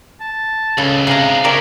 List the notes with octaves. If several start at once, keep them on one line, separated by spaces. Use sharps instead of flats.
A5
C#2 C#3 A4
C3 D4 D#4 G#4 F5 A#5
C#3 F#3 A#4 D5 E5 G5